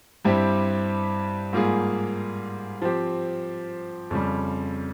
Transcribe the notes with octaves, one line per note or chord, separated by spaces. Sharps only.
G2 G3 C4 E4 G4
G#2 G3 A#3 F4 G#4
F3 C4 G4
F2 C#3 G3